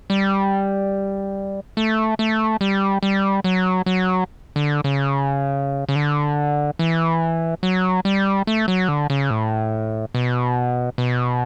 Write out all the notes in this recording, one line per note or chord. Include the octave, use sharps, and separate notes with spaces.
G3
A3
A3
G3
G3
F#3
F#3
D3
C#3
C#3
D3
E3
F#3
G3
A3
F#3
D3
C#3
A2
B2
B2